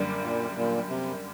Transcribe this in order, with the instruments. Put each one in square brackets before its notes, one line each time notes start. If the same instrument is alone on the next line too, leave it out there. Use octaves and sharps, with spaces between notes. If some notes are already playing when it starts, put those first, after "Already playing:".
Already playing: [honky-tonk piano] F#2 D3 G3 A#3
[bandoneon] A#2
A#2
C3